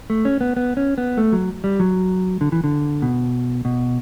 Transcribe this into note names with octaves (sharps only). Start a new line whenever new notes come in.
A3
C#4
B3
B3
C#4
B3
A3
F#3
G3
F#3
D3
E3
D3
B2
B2